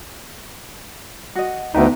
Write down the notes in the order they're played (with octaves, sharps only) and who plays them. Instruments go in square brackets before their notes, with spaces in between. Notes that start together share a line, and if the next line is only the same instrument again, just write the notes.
[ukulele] F#4 D#5
[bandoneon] D2 [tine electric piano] B3 D#4 [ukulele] B4 E5 G5